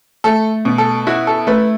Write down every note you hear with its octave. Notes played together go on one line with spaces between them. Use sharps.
A3 A4
B2
A4
E4 F#4
A4
A3 B4